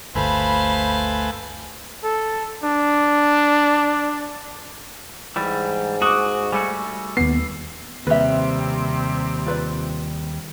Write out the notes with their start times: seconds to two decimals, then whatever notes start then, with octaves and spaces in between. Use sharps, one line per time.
0.15 G1 D2 A3 B4 C5 F5 G#5 B5
2.04 A4
2.63 D4
5.36 G#2 E3 G3
6.02 F#4 D6 D#6
6.52 G3 A3 F#4 G#5
7.17 D#2 B3 C7
8.07 D#2 C3 G3 C4 B4 E5
9.46 F4 B4 D5